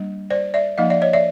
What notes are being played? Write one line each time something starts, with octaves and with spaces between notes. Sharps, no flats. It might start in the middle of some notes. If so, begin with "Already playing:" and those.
Already playing: G3 A#3 D4
C5 D5
D5 E5
F3 A#3 D#4 D#5 F5
D5 E5
C#5 D#5
D5 E5